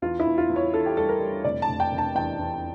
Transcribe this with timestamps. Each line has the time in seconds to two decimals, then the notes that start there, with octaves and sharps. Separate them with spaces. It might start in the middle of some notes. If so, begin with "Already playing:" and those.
0.02 E2 F4
0.20 E4
0.27 E2
0.38 F4
0.49 E2
0.56 C#5
0.73 E3 A4
0.86 G4
0.96 G3 A4
1.09 A#4
1.20 G3
1.44 F1 D5
1.62 A5
1.69 F1
1.80 G5
1.92 F1
1.98 A5
2.15 E2 G5
2.39 E2